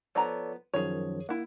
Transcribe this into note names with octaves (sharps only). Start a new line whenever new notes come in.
F3 B3 A4 C#5 D5 A#5
F#2 D#3 F3 G#4 C#5
A#3 E4 F#5